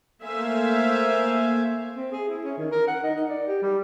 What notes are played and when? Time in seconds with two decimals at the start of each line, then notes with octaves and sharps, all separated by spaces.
0.24 A3 A#3 C5 E5 F5 G#5
1.96 C4
2.12 G#4
2.28 E4
2.44 C#4
2.57 D#3
2.71 A#4
2.88 F#5
3.03 D#4
3.15 D#4
3.29 D5
3.47 G4
3.62 G3